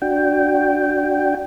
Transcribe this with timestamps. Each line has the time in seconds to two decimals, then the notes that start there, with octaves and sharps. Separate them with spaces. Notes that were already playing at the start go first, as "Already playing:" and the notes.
0.02 D4 F#4 G5